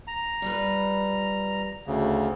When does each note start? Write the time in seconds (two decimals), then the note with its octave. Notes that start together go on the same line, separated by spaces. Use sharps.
0.08 A#5
0.42 G3 F4 B4
1.86 D2 C#3